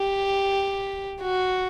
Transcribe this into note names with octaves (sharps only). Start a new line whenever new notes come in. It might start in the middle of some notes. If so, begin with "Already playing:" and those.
Already playing: G4
F#4